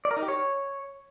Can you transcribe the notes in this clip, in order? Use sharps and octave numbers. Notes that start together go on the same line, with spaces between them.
D5
A#4
D#4
G4
C#5